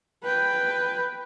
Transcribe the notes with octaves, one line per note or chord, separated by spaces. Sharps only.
B4 G5